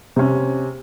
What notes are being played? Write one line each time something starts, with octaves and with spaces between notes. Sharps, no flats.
C3 C#4